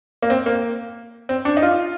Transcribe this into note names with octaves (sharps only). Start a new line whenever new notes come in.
A#3
C4
A#3
C4
D4
D#4
F4